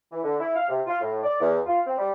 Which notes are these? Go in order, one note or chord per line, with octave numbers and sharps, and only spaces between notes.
E3
D3
E4
F5
C3
F4
A2
D5
E2
F4
C4
G3